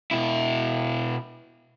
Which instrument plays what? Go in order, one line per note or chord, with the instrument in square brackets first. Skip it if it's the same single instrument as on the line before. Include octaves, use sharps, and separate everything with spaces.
[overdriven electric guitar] B2 E4